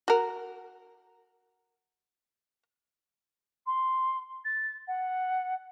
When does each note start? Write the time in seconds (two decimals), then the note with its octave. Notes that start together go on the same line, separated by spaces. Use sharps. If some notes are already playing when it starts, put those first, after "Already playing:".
0.08 F#4 A#4
3.66 C6
4.44 A6
4.87 F#5